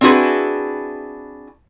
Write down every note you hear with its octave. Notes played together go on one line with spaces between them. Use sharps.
C4 D4 E4 F#4 G#4 B4